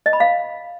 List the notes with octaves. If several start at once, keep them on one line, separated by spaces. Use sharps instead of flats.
D#5
B5
F5